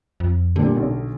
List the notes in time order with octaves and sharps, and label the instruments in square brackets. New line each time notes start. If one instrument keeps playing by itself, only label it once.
[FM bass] F2
[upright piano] A#2 G3 [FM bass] D3
[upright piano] B1